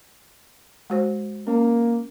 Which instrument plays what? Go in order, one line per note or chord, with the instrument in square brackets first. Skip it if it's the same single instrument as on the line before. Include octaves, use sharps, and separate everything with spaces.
[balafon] G#3 F#4 C5
[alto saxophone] A#3 [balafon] C#4